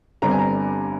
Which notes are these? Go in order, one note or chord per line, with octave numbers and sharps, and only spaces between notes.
G1 G2 D3 G3 C4 A#5
G#5
A#5